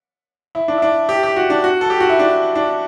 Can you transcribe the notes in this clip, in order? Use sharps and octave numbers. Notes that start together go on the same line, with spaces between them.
E4
D4
E4
D4
G4
G4
F#4
D4
F#4
A4
G4
F#4
E4
D4
D4